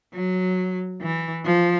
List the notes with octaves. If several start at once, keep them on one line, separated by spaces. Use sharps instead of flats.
F#3
E3
F3